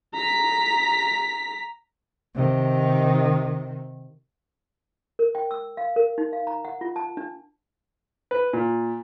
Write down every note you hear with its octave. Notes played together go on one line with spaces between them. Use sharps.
A#5 B6
C3 D#3
A#4
G5
E6
F5
A#4
D#4
F5
A#5
F#5
F4
A5
D4
B4
A#2